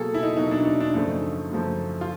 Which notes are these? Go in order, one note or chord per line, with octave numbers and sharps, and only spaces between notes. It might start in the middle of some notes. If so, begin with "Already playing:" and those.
Already playing: B2 F#3 A#3 G#4 A4
E4
D#4
B2 F#3 A#3 D#4
D4
D#4
D4
F#2 C#3 F3 A3 D#4
F#2 C#3 F3 A3
F4